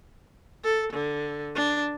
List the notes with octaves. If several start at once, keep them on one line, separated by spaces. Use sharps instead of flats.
A4
D3
D4